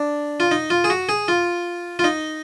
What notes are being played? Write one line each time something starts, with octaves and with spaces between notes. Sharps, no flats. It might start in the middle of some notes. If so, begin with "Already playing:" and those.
Already playing: D4
F4
D#4
F4
G#4
F#4
G#4
F4
F4
D#4